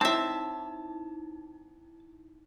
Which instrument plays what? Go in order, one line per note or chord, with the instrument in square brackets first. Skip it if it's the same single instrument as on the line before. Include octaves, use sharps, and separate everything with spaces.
[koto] C4 E5 [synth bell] D#4 E4 [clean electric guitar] A5